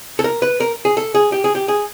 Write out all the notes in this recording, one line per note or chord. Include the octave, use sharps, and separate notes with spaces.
A4
A#4
B4
A#4
G#4
A4
G#4
G4
G#4
G4
G#4